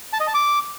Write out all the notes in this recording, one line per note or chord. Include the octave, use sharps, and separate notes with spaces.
A5
D#5
A5
D6